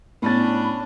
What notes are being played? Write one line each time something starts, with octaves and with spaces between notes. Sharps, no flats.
A2 B3 C#4 D4 B5 A6